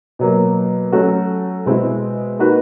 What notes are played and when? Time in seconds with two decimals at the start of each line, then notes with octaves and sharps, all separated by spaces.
0.19 B2 F#3 A#3
0.92 F#3 A3 C#4 F#4
1.66 B2 G#3 C4 E4
2.39 A#3 D#4 F#4 B4